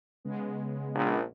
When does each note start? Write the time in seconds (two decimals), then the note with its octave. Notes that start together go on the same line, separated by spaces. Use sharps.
0.25 C#3 G#3 B3
0.94 A#1